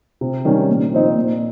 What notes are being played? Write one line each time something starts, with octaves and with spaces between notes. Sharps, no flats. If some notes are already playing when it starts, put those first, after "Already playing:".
C3
D#3 G3 C#4
A#2
F3 C4 D#4
A#2